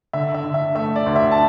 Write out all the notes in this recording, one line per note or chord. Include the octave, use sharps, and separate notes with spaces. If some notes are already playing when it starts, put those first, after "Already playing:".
D3 E5
E5
D3
E5
A3 E5
D5
D2
E5
A5